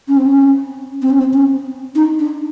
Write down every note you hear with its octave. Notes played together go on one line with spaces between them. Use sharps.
C#4
C4
C#4
C4
C#4
C4
C#4
D#4
D4